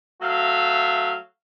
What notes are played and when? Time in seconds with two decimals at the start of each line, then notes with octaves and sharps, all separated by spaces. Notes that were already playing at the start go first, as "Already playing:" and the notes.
0.22 F#3 A3 F#4 E5 F5